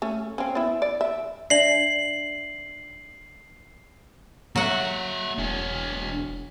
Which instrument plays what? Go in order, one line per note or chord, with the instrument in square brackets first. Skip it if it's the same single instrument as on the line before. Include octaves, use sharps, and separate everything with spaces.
[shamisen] A3 C#4
C4 C#4
B3 E4
D5
E5
[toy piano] D4 D5 E5 [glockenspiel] C7 F#7
[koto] F#3 F#5 [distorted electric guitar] A#3 E5
[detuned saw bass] E1 [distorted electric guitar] D4 C#5